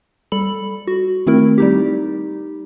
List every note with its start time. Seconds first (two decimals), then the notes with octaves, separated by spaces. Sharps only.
0.32 G3 A4 B5 F#7
0.87 F#4
1.27 D#3 A3 C4 E4 A#4
1.58 G3 D#4 G4